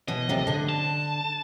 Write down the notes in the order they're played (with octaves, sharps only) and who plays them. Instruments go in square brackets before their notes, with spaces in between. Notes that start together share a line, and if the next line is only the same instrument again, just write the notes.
[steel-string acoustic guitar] B2 E3 [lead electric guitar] D#5
[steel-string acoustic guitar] D2 C3 F3
D3 D4
[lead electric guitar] A5